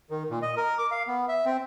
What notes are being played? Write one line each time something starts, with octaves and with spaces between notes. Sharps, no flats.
D#3
A#2
D#5
A#4
D6
F5
B3
E5
C4